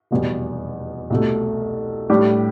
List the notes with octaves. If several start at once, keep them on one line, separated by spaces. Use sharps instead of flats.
F1 E2 B2 G3
C2 B2 A3
A2 G3 D4 G4